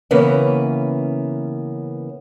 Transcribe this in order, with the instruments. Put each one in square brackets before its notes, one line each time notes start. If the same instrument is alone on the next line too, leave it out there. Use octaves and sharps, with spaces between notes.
[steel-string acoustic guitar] C#3 E3 A#3 B3 C#4